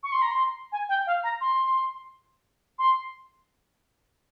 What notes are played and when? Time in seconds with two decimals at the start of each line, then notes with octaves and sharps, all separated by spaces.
0.03 C#6
0.12 C6
0.21 A#5
0.31 C6
0.72 G#5
0.89 G5
1.06 F5
1.23 A#5
1.40 C6
2.78 C6